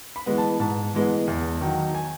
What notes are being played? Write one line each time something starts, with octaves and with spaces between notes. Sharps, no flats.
B5
E3 G#3 B3
A5
G#2 A5
E3 G#3 B3
E2
D#3 F#3
G#5